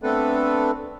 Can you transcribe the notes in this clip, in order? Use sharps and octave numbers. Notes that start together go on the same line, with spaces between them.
A3 B3 C4 D4 A4 B4